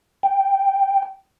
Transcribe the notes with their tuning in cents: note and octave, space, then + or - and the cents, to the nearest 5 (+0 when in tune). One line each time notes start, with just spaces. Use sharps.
G5 -5